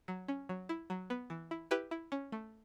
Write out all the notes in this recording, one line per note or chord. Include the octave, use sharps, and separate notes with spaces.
F#3
C#4
F#3
E4
F#3
B3
E3
E4
E4 G4 B4
E4
C#4
A3